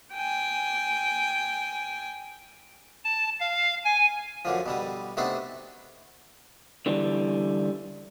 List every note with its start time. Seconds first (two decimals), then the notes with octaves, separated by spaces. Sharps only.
0.14 G5 G#5
3.04 A5
3.40 F5
3.84 G#5
4.45 F#2 D3 F3
4.66 B2 D3 G3
5.17 C3 A3 B3 D4 D#4
6.86 D3 E3 G3